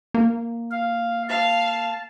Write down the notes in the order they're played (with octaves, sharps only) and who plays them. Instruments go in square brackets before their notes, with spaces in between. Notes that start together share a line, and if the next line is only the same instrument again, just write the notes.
[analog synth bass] A#3
[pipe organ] F5
[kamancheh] F5 [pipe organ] A5